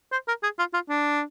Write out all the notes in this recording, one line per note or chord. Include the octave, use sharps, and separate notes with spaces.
C5
A#4
G#4
F4
F4
D4